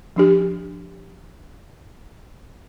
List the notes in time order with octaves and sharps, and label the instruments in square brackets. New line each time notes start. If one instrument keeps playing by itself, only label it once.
[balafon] F3 D4 G4